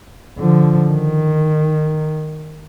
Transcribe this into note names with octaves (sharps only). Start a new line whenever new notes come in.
D3 F3
D#3